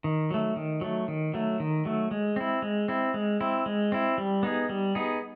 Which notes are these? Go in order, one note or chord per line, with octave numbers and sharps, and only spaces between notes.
D#3
F#3 A3
D#3
F#3 A3
D#3
F#3 A3
D#3
F#3 A3
G#3
C4 E4
G#3
C4 E4
G#3
C4 E4
G#3
C4 E4
G3
B3 D#4 G#4
G3
B3 D#4 G#4